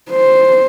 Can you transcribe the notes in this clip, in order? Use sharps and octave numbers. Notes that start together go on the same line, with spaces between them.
C5